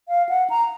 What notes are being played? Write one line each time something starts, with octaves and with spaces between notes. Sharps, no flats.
F5
F#5
A#5